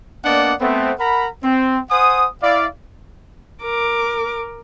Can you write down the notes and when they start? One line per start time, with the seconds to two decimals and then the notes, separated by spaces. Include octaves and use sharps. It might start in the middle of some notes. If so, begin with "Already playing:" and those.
0.25 A#3 B3 D4 D5 D#5 F#5
0.61 A3 B3 C4
1.00 A#4 F#5 A#5 B5
1.43 C4
1.91 C5 F#5 G#5 D#6
2.43 E4 D5 F5
3.63 A#4 D6